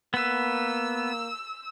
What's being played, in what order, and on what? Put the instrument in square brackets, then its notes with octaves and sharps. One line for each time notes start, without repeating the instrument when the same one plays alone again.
[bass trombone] A#3 [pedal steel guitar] B3 B4 [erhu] E6